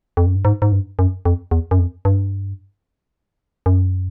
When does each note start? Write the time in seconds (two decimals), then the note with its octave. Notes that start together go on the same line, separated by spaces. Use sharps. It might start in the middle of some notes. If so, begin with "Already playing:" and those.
0.17 F2
0.26 F#2
0.35 G2
0.45 G#2
0.62 G#2
0.72 G2
0.99 F#2
1.25 F2
1.51 E2
1.71 F#2
1.79 F2
2.05 G2
3.66 F#2